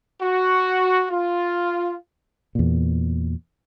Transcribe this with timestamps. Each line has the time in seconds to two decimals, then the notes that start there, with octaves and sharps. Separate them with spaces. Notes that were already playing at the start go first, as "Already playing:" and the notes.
0.21 F#4
1.11 F4
2.55 E2 A#2